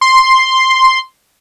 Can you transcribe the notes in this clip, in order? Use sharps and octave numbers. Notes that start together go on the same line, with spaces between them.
C6